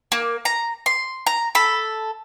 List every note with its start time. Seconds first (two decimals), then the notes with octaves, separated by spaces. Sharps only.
0.12 A#3
0.45 A#5
0.86 C6
1.27 A#5
1.55 A4 B5